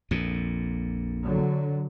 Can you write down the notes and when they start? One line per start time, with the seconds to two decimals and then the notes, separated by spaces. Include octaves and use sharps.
0.11 A#1 F2 A#2
1.22 D3 F#3